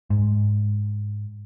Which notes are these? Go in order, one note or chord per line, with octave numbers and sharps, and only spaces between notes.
G#2